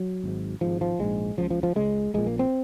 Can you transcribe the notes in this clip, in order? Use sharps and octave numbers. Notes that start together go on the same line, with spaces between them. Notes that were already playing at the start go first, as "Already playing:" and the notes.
Already playing: F#3
G#1 G#2
G#1 G#2 F3
F3
A#1 G#2 G#3
C#2 C#3 F3
F3
F3
C#2 C#3 G#3
A#1 A#2 G#3
A#3
C4